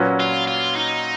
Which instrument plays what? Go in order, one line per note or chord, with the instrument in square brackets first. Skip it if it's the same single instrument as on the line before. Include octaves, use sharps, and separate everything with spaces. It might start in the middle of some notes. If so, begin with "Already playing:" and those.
Already playing: [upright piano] A#2 F#3 C#4 F#4 B4
[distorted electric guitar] F4
F4
D#4